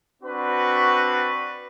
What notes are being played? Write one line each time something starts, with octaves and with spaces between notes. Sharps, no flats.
C4 D4 F#4 B4